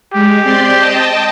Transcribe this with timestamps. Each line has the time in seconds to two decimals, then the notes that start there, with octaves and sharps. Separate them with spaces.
0.13 G#3 G4
0.44 C4 D5 C6
0.76 D#5 G5 A5